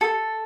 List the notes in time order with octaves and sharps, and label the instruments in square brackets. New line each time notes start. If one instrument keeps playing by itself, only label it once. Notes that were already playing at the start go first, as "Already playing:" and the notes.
[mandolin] A4